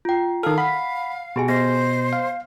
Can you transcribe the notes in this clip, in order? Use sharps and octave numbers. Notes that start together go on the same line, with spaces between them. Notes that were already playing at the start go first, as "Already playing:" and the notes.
F4 G5
D#3 A4 F5 F6
F#5 B5 B6
B2 G4 G#4 G#5
B3 C5 D#5 A#6
F5